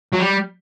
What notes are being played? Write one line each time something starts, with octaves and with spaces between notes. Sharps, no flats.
F#3
G3